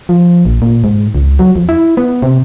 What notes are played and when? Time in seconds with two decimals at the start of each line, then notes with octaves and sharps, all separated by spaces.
0.09 F3
0.45 A#1
0.62 A#2
0.84 G#2
1.15 C#2
1.39 F#3
1.56 F2
1.69 E4
1.97 B3
2.22 C3